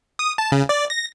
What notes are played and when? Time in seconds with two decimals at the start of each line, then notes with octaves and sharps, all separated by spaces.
0.19 D#6
0.38 A5
0.52 C#3
0.69 D5
0.90 A#6